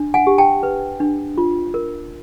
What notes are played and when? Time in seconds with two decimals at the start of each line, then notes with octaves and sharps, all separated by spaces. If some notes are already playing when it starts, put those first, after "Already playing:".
Already playing: D4
0.14 F#5 G#5
0.27 G4
0.38 G5 A5
0.63 B4
1.00 D4
1.38 F4
1.74 A#4